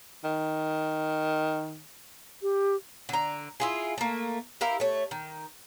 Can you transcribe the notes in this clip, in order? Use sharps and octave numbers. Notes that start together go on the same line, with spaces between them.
D#3
G4
D3 A#5
E4 F4 G#4
A3 A#3
E4 G4 A#4 F5
A3 C#5
D#3